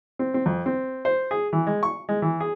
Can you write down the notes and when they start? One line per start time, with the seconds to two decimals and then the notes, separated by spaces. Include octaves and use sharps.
0.19 C4
0.34 C4
0.46 F2
0.66 C4
1.05 C5
1.31 G#4
1.53 E3
1.67 G#3
1.83 C#6
2.09 G#3
2.22 E3
2.40 G#4